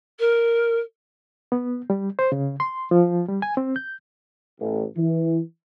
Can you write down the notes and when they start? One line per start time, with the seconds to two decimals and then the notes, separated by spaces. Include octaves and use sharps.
0.19 A#4
1.52 B3
1.90 G3
2.19 C5
2.32 C#3
2.60 C6
2.91 F3
3.28 G3
3.42 G#5
3.57 C4
3.76 G6
4.61 A1
4.96 E3